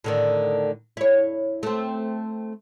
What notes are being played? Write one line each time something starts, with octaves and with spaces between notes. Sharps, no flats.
A2 D3 D#3
E4 C#5
A3 C4